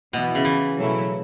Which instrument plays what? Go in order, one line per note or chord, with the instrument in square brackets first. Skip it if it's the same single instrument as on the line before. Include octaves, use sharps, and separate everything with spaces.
[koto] B2 [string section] E3 B3 E4
[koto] C#3
E3
[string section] B2 F#3 A3 C#4 E4